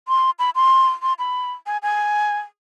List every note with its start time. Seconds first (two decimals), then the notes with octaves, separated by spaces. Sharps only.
0.08 C6
0.39 B5
0.55 C6
1.02 C6
1.19 B5
1.66 G#5
1.83 G#5